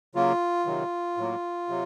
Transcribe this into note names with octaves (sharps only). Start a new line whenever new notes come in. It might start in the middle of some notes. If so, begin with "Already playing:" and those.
C#3 F#3 A#3 F4
C3 D#3 F#3
A2 F#3 A#3
C3 F#3